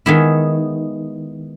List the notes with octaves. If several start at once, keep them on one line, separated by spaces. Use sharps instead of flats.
D#3 G#3 B3 E4